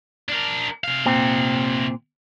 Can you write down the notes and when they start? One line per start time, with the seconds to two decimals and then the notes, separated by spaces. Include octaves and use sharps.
0.29 D4 A#4
0.84 C3 F5
1.06 A#2 C4